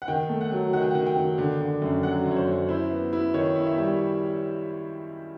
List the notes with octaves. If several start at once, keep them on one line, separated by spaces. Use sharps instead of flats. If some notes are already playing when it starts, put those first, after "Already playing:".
F#5
D#3 G5
A3
F#5
F#3
D#3 F#5
G5
D#3 F#5
G5
D#3
D3
D3
F#2
F#3 F#5
F#2
C#5
C5
F#2
E4 C5
B3
E4
D#3 C#5
E4
E5
G3